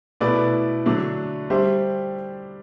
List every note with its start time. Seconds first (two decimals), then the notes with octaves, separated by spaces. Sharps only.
0.21 B2 A3 E4 B4 D5
0.86 D3 F#3 A3 D4
1.50 G3 D4 G4 C5 E5